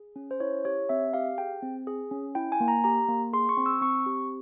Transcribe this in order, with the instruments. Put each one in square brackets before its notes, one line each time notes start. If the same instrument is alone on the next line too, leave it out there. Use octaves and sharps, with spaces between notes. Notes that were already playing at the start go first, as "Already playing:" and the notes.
Already playing: [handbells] G#4
C#4
C5
E4 C#5
G4 C#5
C4 E5
G4 F5
G#4 G5
C4
G#4
C#4
E4 G5
G#5
A#3
A#5
G4 A#5
A#3
G#4 C6
C#6
C4
E6
C4 C#6
G4